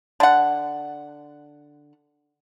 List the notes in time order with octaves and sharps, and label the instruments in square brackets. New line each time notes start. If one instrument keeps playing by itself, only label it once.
[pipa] D3 F#5